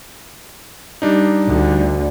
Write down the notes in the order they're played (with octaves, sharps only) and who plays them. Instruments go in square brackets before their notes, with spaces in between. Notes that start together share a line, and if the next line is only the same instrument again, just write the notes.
[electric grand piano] G3 D4 D#4
[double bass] D2 D3